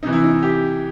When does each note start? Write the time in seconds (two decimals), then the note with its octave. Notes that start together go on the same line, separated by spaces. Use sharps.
0.03 C3 E3 D#4
0.13 E4
0.24 D#4
0.43 G4